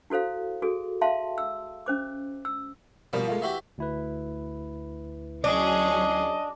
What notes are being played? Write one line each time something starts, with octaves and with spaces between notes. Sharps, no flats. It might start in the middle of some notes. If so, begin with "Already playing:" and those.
E4 F#4 A4 C5 F5
F#4 G#4 A4
E5 F5 A5 C6
E6
C#4 C5 D6
E6
B2 F3 G3 A#3
G#3 A3 F4
E3 F#4 G4 E5
D2 E4 B4
F#3 C#4 D4 G#4 D#5